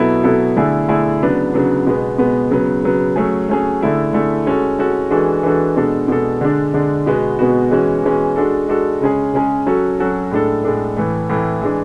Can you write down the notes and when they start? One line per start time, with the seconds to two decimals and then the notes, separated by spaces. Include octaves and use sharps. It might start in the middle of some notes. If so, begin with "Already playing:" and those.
Already playing: B2 F#3 B3 E4 A4
0.23 B2 F#3 B3 E4 A4
0.56 D3 A3 E4 G#4
0.88 D3 A3 E4 G#4
1.22 C#3 F#3 B3 D4
1.54 C#3 F#3 B3 D4
1.87 B2 G#3 B3
2.19 B2 G#3 B3
2.51 C#3 F#3 B3
2.84 C#3 F#3 B3
3.16 F#3 A3 C#4 G#4
3.49 F#3 A3 C#4 G#4
3.81 D3 A3 E4 G#4
4.13 D3 A3 E4 G#4
4.46 G#3 C#4 F#4 A4
4.78 G#3 C#4 F#4 A4
5.11 E3 G#3 D4 F#4 A4
5.43 E3 G#3 D4 F#4 A4
5.76 B2 G#3 D4 A4
6.08 B2 G#3 D4 A4
6.41 D3 G#3 D4
6.74 D3 G#3 D4
7.06 B2 G#3 B3 F#4
7.39 B2 G#3 B3 F#4
7.71 E3 G#3 C#4 F#4
8.04 E3 G#3 C#4 F#4
8.36 G#3 D4 F#4 A4
8.69 G#3 D4 F#4 A4
9.01 C#3 G#3 C#4 G#4
9.33 C#3 G#3 C#4 G#4
9.66 F#3 C#4 F#4 A4
9.99 F#3 C#4 F#4 A4
10.31 A2 G#3 D4 A4
10.64 A2 G#3 D4 A4
10.97 A2 E3 A3
11.29 A2 E3 A3
11.62 E3 G#3 D4